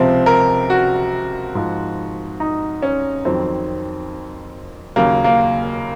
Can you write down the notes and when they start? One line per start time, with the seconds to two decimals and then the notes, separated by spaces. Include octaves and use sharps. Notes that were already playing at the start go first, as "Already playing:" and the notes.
Already playing: C#2 C3 F3 C4
0.26 A#4
0.70 F#4
1.55 G#2 F3
2.40 D#4
2.83 C#4
3.25 F2 D#3 F#3 C4
4.96 D#2 C#3 F#3 A#3
5.24 A#3